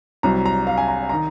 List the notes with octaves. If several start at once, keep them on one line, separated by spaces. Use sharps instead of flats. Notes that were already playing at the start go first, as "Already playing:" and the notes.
C2 C3 F#3 A#5
A#5
F5
G#5
A#5
D#3 A#5